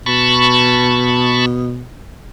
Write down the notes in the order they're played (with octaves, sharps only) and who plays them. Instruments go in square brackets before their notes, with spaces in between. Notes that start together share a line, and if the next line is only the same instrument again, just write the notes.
[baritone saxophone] B2 [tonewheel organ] A5 B5 C#6